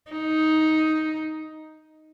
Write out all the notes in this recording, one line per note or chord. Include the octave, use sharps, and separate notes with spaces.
D#4